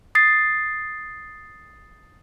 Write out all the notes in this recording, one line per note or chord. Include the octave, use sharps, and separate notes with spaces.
D#6 A6 C7